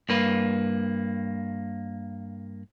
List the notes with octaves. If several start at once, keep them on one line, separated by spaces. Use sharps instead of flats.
G2 A#3 B4